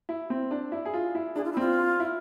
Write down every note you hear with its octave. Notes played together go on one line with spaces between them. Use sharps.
E4
C4
D4
E4
G#4
F4
E4
D4 G#4
F4
E4
C4 F4
E4